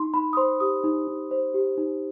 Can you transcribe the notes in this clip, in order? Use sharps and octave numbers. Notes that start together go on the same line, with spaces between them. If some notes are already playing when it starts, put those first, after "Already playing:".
Already playing: D#4 C6
D#4 B5
D#6
C5 C6
G4 D#6
D#4
D#4
C5
G4
D#4